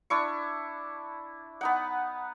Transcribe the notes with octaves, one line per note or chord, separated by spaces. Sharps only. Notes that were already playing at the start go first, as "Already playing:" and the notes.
D4 E4 C#6
B3 D#4 F#5